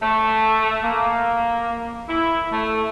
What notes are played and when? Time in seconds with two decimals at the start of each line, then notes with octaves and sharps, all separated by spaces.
0.01 A3
0.83 A#3
2.08 E4
2.52 A3